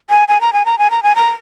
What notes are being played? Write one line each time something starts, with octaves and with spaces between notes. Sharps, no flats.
G#5
G#5
A#5
G#5
A#5
G#5
A#5
G#5
A#5